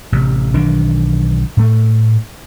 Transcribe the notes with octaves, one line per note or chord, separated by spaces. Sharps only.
A1 C3
B1 D#3 E3 D4
A2 A3